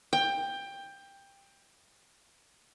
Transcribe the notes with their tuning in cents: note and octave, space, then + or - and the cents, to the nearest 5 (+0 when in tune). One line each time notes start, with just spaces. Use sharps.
G5 +15